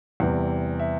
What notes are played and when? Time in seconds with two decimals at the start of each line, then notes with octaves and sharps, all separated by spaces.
0.20 E2 C3 E3 G3
0.79 E5